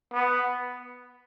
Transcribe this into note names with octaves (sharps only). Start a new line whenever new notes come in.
B3